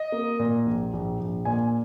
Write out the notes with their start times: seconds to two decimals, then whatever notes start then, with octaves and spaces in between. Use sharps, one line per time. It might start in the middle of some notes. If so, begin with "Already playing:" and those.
Already playing: D#5
0.12 A#3
0.39 A#2
0.66 A#1
0.93 A#1
1.20 A#1
1.45 A#2 G#5